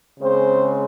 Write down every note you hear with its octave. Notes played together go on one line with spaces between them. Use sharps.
C#3 G#3 C4 C5